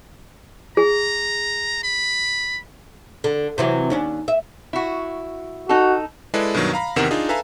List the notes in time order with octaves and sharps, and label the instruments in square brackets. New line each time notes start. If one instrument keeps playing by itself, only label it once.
[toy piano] G#4 [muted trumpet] A#5
[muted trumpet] B5
[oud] D3
C3 E3 F#3
D#2 C#4 D4
E5
[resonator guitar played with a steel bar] E4 F#4
[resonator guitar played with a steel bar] D#4 A4 [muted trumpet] F#4
[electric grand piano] G#3 E4 G#4 A4 B4 D5
G2 B2 D#3 F#3
F5 A#5 B5
E2 C3 D#3 A#4 F#5 E7
D4 D#4 F4 G#4
A4 B4 E5 F5 G#5 A#5